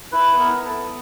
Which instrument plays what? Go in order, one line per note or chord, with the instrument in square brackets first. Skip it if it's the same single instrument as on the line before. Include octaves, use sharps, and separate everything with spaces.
[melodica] E4 B4
B3
A#4
E4
A4
B3